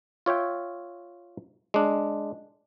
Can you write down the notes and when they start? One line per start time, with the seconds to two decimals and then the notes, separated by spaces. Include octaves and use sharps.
0.26 F4 C#5 E5 G5
1.74 G#3 D4